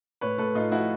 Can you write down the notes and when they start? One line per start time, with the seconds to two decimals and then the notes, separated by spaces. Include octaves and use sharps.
0.21 A2 B4 C#5
0.38 A2 A4 B4
0.55 A2 D#4 F4
0.72 F3 E4 F#4